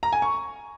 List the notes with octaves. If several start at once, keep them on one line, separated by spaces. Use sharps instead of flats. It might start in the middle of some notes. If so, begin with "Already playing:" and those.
A#5
G#5
C#6